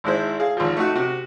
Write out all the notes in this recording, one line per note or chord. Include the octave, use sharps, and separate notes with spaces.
G#1 G#3 E4 C5
G#4 F5
G#1 F3
A3 D#4 F#4
C3 F#4